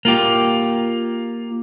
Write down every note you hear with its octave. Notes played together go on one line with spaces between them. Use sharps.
A#3 F4 G4